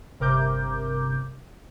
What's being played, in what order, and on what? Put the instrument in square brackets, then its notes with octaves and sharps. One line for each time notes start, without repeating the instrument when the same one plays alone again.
[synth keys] G1 C3 A#4 D6 G6